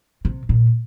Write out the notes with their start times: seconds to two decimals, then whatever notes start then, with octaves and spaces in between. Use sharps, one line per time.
0.25 C3
0.49 A#2